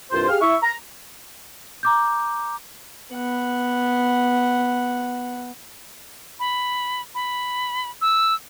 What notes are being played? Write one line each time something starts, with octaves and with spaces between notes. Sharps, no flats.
C2 G2 F4 C5
G4 G#4 F5 F6
E4 E5 C#6
A#5
A#5 D6 G6
B3 F#5
B5
B5
E6